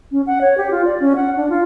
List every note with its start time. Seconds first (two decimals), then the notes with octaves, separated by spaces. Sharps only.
0.12 C#4
0.27 F#5
0.41 C#5
0.58 G4
0.71 F4
0.85 D5
1.00 C#4
1.16 F#5
1.36 D4
1.50 F4